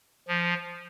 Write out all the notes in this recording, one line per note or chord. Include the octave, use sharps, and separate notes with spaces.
F3